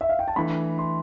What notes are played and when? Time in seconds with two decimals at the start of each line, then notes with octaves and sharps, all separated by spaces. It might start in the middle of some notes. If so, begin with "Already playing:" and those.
0.01 E5
0.09 F5
0.19 G5
0.28 A5
0.36 E3 A3 D4 B5
0.78 C6